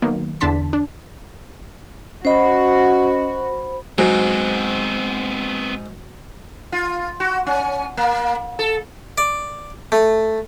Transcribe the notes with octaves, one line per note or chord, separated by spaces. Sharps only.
D#3 F#3 A#3 B3
E2 D3 D4 A5 C6 B6
D4
C#4 F#4 C5 D#5 B5
G#2 F#3 B3 C4 F#4
F4
F#4
C#4
A#3
A4
D5
A3